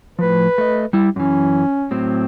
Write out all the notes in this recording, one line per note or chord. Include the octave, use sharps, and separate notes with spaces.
A2 F3 B4
A3 D#5
G3 E4
F#2 E3 C#4
A2 F#3 C4